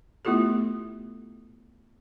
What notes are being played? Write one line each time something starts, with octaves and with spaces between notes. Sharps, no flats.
A3 B3 E4 F4 G4 A4